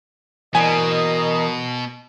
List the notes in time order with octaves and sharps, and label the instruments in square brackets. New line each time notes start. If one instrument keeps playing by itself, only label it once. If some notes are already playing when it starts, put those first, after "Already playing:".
[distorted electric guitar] B2 [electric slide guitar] E3 C5 D5 [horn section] A#4 D#5 [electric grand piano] G#5